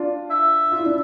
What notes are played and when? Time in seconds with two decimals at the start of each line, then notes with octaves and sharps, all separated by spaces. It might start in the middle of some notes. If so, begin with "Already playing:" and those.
Already playing: D4 F4
0.30 E5
0.71 F4
0.78 E4
0.85 D4